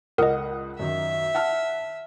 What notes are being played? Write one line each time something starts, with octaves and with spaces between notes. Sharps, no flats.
C#2 A#4 D#5 F#5 D#6
F#2 D#3 E5
F#5 A5 F6